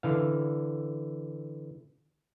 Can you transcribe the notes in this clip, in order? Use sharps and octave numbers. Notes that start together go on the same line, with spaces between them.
D3 E3 F5